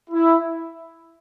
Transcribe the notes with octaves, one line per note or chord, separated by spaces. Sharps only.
E4